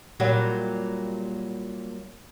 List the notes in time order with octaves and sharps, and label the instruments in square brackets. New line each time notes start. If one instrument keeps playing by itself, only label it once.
[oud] A#2 F#3 G3